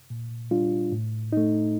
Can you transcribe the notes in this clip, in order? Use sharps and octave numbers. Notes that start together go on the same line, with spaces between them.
A#2
G3 D4 F4
A2
A3 D#4